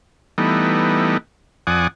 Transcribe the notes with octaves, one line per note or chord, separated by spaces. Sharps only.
E3 G3 A3 B3 D#4
F2 D5 F#5 G#5 D#6